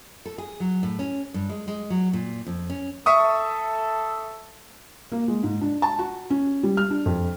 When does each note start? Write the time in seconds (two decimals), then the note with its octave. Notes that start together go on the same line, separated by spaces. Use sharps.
0.26 A4
0.38 G#4
0.60 F#3
0.83 A2
0.99 C#4
1.34 G2
1.49 G#3
1.68 G#3
1.90 F#3
2.13 A#2
2.46 F2
2.70 C#4
3.06 A4 E5 C#6 D#6
5.12 A#3
5.28 G#3
5.43 G#2
5.61 D4
5.82 A5
5.99 F#4
6.30 C#4
6.63 G3
6.77 F6
6.90 D4
7.06 F2